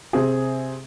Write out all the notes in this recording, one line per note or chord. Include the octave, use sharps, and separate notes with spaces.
C3 C4 G#4